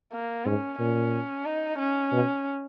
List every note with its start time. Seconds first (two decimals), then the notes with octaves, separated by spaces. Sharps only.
0.13 A#3
0.46 G#2 C#4
0.79 A#2 C#4
1.46 D#4
1.79 C#4
2.12 B2